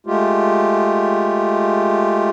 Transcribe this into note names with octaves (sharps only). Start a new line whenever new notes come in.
G#3 A3 F4 G4